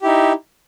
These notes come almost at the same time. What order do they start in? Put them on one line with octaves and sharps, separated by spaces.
G4 E4 D#4